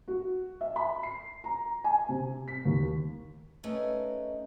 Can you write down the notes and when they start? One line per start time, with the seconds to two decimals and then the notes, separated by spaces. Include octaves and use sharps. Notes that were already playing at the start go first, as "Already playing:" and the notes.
0.08 F#4
0.61 E5
0.76 B5
1.03 C7
1.44 A#5
1.84 G#5
2.09 C3
2.48 B6
2.65 D#2
3.63 A3 C#4 D#4 A#4 B4 D#5